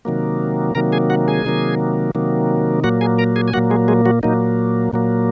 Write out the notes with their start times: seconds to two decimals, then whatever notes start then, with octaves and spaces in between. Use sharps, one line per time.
0.05 C3 D#3 F#3 A#3
0.75 C3 D#3 F#3 A#3 A#4 A#5
0.92 G#4 G#5
1.10 F#4 F#5
1.28 G#4 G#5
1.45 C3 D#3 F#3 A#3
2.15 C3 D#3 F#3 A#3
2.84 A#2 F#3 A#3 F#4 F#5
3.01 G#4 G#5
3.18 A#4 A#5
3.36 G#4 G#5
3.48 G#5
3.53 A#2 F#3 A#3 F#4 F#5
3.70 G#3 G#4
3.88 G#3 G#4
4.05 F#3 F#4
4.23 A#2 F#3 A#3 D#4
4.93 A#2 F#3 A#3